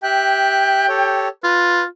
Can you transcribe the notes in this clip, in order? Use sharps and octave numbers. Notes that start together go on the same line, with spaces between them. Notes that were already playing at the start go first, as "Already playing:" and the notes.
G4 E5 G5 F#6
G4 A4 C#5
F4 B4